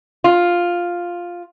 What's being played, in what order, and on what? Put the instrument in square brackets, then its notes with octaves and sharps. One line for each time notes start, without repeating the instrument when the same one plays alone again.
[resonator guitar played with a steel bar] F4